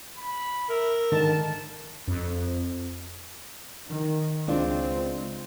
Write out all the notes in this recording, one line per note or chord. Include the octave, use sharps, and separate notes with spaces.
B5
A#4 E5
G#2 D3 D#3 A5
F2
D#3
C#2 G#3 C4 D4 F4